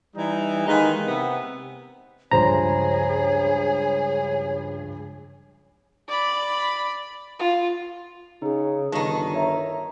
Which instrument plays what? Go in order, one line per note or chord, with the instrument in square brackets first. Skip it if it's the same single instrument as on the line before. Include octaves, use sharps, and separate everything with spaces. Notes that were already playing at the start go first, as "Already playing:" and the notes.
[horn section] E3 G3 D#4
D#3 G#3 A#3 D#4 G#4 B4
C3 B3
[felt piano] C#2 G2 F3 [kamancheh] G#4 [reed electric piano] C5 A#5 [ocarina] C#5
[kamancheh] D5 B5
F4
[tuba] C#3 [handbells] D#4 G#4
[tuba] G1 [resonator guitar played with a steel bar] D#3 D#4 [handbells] A5 C#6
[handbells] C#5 E5 A#5